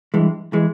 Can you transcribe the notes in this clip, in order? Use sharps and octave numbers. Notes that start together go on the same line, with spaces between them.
G2 E3 G#3
E3 G#3